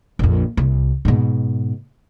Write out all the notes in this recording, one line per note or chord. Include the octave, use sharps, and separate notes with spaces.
A#1 F2
C2
G#2 B2